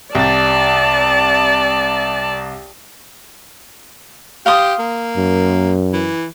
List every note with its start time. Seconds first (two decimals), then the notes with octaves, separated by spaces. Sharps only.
0.15 C2 D5 A5 A6
4.46 G4 F5 C6 D#6
4.79 A#3
5.17 F#2
5.93 E3